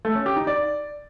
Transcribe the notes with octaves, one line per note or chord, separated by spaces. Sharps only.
A3
C#4
G4
D#4
D5